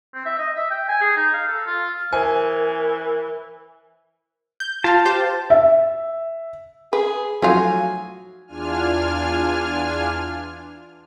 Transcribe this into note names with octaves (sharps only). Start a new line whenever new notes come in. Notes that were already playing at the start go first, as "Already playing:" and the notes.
C4
E5
D#5
E5
G5
G#5
G#4
D#4
F5
A4
F4
E3 A#4 C5 G#5
G6
F4 F5 A5
G4 C5
E5
G#4 B4
F3 F#3 A3 D#4 F4 F#4 G#5
E2 D4 F4 G#5 F6